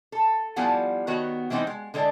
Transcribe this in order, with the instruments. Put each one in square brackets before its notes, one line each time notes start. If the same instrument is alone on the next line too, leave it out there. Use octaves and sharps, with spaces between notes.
[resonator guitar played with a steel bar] A4
F3 G3 B3 E4 F#5 G#5
D#3 B3 F#4 C#5
E3 G3 B3 C4 D#4
G#3
D3 G#3 A4 D5